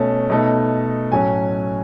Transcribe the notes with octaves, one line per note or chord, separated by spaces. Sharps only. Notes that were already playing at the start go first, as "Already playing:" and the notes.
Already playing: B2 A3 C#4
B2 A3 D#4
A2 F#3 C#4 G#5